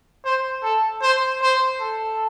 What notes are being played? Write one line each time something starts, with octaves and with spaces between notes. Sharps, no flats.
C5
A4
C5
C5
A4